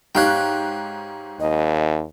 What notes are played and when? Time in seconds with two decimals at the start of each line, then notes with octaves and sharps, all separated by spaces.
0.15 G#2 G4 C#5 F5 G5 F#6
1.40 D#2 D#5